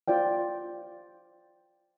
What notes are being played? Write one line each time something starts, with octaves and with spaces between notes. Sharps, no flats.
F4 C5 D5 G5